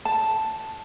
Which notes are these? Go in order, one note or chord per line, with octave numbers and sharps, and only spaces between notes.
A5